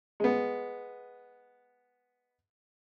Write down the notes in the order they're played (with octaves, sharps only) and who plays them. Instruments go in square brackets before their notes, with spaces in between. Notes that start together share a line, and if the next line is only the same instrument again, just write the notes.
[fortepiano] G#3 B3